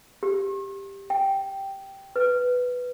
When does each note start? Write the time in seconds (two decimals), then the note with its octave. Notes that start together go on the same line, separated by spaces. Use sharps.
0.23 G4
1.10 G5
2.16 B4